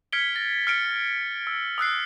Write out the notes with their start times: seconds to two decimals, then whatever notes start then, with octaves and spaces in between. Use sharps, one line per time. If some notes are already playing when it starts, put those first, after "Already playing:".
0.12 F6 G#6 B6 C#7 D7 G7
0.35 A6 A#6
0.67 F6 C#7 D7
1.47 E6
1.78 D#6 E6 F#6 C7